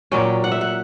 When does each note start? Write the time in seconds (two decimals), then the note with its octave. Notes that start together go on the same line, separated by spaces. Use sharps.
0.11 A#2 F#3 C#4 G5
0.44 F#5
0.52 E5
0.61 F#5